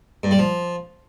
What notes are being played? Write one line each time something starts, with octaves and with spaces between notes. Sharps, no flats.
G2
G3
F3